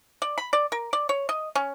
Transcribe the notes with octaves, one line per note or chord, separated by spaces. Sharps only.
D5
B5
D5
A#4
D5
C#5
D#5
C#4